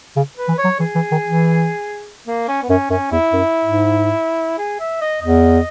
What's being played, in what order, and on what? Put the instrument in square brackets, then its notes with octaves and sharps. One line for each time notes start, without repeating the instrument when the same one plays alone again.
[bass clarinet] C#3
[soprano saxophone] B4
[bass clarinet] E3
[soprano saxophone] C#5
[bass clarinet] F#3
[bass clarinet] E3 [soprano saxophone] G#4
[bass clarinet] E3
D#3
E3
[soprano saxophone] A#3
C#4
B3
[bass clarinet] F#2 [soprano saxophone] C#4
[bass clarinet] F#2 [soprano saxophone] C#4
[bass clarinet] E2 [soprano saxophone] E4
[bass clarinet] F#2
G#2
[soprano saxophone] G#4
E5
D#5
[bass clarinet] E2 [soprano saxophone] D#5